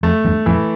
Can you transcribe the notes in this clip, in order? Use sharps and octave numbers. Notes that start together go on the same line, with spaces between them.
F2 A3
E2 G2
F2 A2 E3